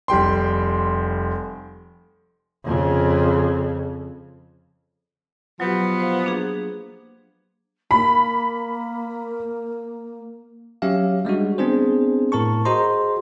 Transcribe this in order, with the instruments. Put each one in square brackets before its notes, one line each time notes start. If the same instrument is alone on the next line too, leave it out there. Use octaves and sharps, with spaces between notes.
[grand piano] F1 G3 G5 C6
[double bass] F2 C#3
[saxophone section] B2 F3 B3 [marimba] F#3 G4
[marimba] C5 F5
A#3 D4 G#4
[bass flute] A#3 [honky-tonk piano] B5
[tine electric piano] F#3 C#4 G4 E5 F5
G3 G#3 D4 F#4
B3 C4 D4 G#4 C5
A2 A#4 A5 C#6
F#4 G#4 C5 D#5 A#5 C6